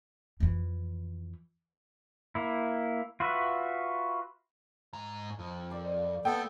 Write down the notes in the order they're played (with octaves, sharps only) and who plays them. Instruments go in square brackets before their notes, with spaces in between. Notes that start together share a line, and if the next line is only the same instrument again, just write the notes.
[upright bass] F2 E3
[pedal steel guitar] A#3 E4
F4 F#4 B4 E5
[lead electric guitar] G#2 A#5
F2
[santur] A#4 C5 D5
[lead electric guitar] A#3 F#5 [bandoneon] B3 A4 [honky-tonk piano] G5